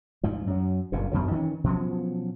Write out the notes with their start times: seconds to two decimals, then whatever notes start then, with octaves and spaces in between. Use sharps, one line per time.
0.23 D2 G#2 F3
0.47 F#2 F#3
0.92 F#1 G2 A#2
1.12 F#2 B2 D3 F#3
1.31 D#3 E3 B3 C#4
1.64 B2 F3 F#3 C#4